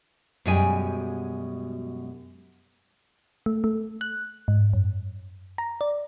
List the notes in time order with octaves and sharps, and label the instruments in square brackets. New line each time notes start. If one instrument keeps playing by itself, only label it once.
[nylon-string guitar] F#2 B2 G3 G#3 G5 G#5
[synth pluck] A3
A3
F#6
G#2
F#2
A#5
D5